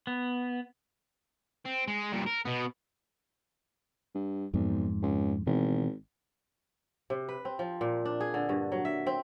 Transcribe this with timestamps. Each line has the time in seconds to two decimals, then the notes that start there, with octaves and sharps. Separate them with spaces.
0.07 B3
1.65 C4
1.88 G#3
2.13 G2 A#2
2.27 A#4
2.45 B2 B3
4.15 G2
4.53 B1 F2 G#2
5.02 C#2
5.47 G#1 B2 E3
7.10 C3
7.29 B4
7.45 C4
7.59 F3
7.81 A#2
8.05 D4
8.20 G#4
8.34 D3
8.49 G2
8.72 F#3
8.85 E5
9.07 C4